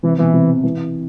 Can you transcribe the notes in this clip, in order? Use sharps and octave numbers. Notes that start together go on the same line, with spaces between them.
C3 E3
B2 E3
C3
E3